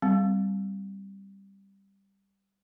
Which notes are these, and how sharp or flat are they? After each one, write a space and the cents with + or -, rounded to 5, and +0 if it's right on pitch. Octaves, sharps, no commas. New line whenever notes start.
G3 +0 C4 -5